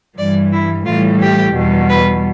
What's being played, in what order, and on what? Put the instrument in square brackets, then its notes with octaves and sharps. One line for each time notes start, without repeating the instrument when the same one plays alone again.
[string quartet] G2 E3 G3 D5
E4
A2 E3 G3 F4
G4
E2 B2 G3
B4